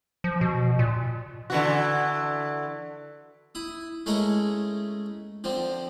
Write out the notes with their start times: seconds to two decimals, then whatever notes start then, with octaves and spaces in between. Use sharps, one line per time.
0.24 F3
0.41 B2
0.79 A#2
1.50 D3 E3 F#4
3.55 E4 D#6
4.06 G#3 A3 C#4 E4 G#4 A#4
5.44 D3 F3 C4